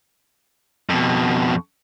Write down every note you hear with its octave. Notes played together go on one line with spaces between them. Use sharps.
F2 B2